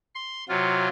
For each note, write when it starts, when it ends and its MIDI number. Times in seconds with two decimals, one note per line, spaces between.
0.15 0.44 84
0.49 0.88 48
0.49 0.88 54
0.49 0.88 65